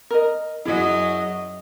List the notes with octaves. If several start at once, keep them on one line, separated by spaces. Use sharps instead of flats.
A#4 D#5
F#2 F#3 E4 G#4 D#5